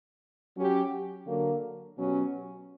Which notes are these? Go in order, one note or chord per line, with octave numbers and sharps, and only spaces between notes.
F#3 C#4 G4
D3 F#3 A#3
B2 F#3 C#4 G4